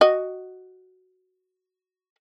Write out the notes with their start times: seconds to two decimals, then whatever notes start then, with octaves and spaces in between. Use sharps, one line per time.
0.01 F#4 D#5